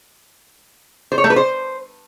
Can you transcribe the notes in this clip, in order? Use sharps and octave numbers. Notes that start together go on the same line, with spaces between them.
C5
C#5
A3
B4
C5